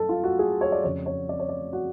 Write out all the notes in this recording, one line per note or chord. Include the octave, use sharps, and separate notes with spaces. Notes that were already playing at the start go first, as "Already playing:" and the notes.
Already playing: F#2 A4
F4
F#4
G#4
C#5
D5
F2 C#3 C#5
C#5
D5
C#5
D5
F#4